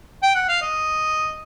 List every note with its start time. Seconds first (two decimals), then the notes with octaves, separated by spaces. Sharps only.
0.23 G5
0.35 F#5
0.49 F5
0.62 D#5